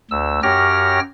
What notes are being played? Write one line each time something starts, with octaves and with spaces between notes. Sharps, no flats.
D2 E6
F#2 G4 C#5 G5 F6 A#6